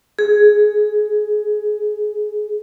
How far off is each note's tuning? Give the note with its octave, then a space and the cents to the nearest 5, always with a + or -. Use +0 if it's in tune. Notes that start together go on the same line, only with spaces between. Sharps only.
G#4 +10